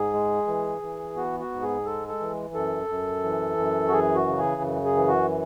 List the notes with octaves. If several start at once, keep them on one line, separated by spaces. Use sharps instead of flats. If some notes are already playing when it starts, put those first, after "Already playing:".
Already playing: G#2 G#4
G#3
E3
E3
B3 F#4
F#4
G#2
G#4
G#3 A4
A4
E3
F#2 A4
F#2
E3
F#2
F#4
E3 G#4
F#4
C#3
G#4
F#2
G#4
E3
F#4